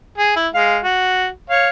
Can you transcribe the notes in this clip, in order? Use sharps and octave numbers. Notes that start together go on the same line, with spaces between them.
G#4
E4
G#3 F5
F#4
C#5 F5